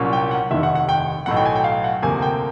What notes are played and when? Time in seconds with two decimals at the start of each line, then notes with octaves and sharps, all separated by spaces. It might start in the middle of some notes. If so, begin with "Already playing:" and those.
Already playing: C2 A#2 F#3 A#3 C#4
0.13 G5
0.31 F#5
0.51 F1 D#2 D#3 E5
0.63 F#5
0.75 F#5
0.89 G5
1.26 B1 A2 F#3 F#5
1.36 G5
1.45 G#5
1.55 G5
1.64 F5
1.84 F#5
2.02 D2 C3 F3 A#3 G#5
2.22 G5